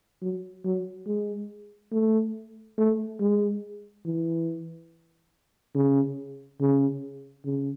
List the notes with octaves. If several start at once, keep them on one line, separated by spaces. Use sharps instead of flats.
F#3
F#3
G#3
A3
A3
G#3
E3
C#3
C#3
C#3